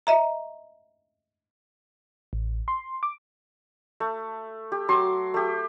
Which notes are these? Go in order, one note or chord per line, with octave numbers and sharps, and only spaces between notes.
D#5 E5 A#5
A1
C6
D6
A3
G4
F#3 C6 D6
A3 G4